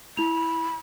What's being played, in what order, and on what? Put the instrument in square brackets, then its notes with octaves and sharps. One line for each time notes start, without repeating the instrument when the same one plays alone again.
[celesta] E4 F7 [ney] B5